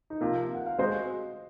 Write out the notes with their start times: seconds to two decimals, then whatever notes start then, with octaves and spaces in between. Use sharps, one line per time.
0.10 D#4
0.21 C3 F3 A#3 F4
0.55 F#5
0.66 F5
0.78 G#3 C4 F#4 C5 D#5